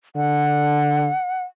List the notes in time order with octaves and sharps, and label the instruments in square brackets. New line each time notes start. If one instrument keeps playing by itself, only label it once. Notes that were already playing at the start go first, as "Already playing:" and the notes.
[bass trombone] D3 [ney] F#5